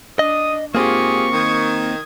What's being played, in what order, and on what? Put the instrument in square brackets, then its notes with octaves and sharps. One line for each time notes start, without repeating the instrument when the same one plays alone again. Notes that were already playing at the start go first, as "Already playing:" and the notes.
[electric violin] D4 [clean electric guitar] D#5 [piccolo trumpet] D#6
[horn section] G#2 G#4 [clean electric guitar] A#3 C4 [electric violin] F4 G4 [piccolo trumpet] C#6
[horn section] D#3 [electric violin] D#6 G#6